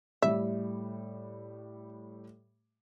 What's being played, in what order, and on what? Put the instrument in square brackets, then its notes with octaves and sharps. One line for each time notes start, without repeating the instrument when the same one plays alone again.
[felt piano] A2 G3 [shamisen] E5